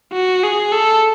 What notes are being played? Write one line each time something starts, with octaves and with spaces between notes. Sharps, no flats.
F#4
G#4
A4